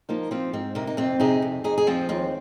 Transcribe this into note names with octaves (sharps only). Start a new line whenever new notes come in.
F3 A#3 D#4
F3 C4 F4
G#2 C4
C3 A#3 D#4
D#4
F2 C4 F4
C3 D#4 G#4
F2
F2 D#4 G#4
G#4
F3 C4 F4
D#2 C4